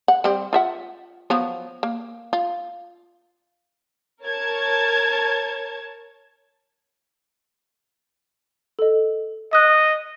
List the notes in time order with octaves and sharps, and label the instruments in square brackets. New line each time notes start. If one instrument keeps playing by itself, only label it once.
[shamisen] F#5
G3 C4
F4 E5 F#5
F3 F#3 B3
A#3
F4
[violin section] A#4 C#5 A5 G#6
[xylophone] A4 D#5
[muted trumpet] D#5 [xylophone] D#6 F#6